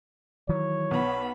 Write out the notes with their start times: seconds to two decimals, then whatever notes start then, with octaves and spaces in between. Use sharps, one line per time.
0.49 D#3 E3 F#3 C#5
0.91 B1 B3 B5